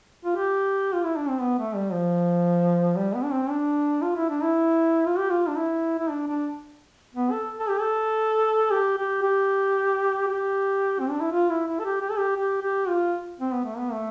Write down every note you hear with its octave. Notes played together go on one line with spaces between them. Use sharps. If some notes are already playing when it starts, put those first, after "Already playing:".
F4
G4
F4
E4
D4
C4
B3
A3
G3
F3
G3
B3
D4
C4
D4
F4
E4
D4
E4
F4
G4
F4
D4
E4
E4
D4
D4
B3
A4
A4
G4
A4
G4
G4
G4
G4
C4
D4
E4
F4
E4
E4
A4
G4
G4
A4
G4
G4
G4
F4
C4
B3
A3
B3
A3